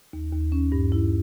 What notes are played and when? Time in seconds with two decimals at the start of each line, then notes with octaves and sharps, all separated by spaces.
0.13 D#2
0.33 D#2
0.52 C#4
0.72 G2
0.92 E4